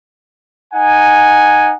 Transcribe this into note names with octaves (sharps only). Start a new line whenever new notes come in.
D#4 F#5 G#5